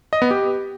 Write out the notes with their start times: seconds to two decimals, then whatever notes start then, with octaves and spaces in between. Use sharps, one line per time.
0.13 D#5
0.22 B3
0.31 G4